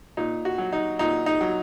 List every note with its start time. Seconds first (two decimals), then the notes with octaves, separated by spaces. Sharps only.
0.17 A#2 D#4
0.45 F#4
0.58 F#3
0.73 D#4
0.99 A#2 D#4
1.26 D#4
1.41 F#3